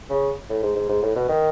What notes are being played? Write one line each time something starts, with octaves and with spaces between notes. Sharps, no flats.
C#3
A2
G#2
G#2
G#2
A2
B2
D#3